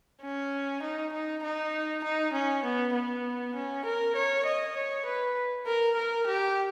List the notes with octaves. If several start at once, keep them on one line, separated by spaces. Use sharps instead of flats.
C#4
D#4
D#4
D#4
D#4
C#4
B3
B3
C#4
A#4
C#5
D#5
C#5
B4
A#4
A#4
G4